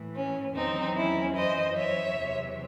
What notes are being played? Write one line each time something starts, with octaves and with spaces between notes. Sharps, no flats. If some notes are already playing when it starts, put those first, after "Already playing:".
Already playing: A2 E3
C#4
E2 D#3 F#3 C4 D#4
C#4 E4
F#2 E3 C5 D#5
C#5 E5
E2 C3 F#3